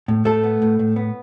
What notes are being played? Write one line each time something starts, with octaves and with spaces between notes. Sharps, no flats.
A2
A2 A3 A4
B3
A2
A2
B3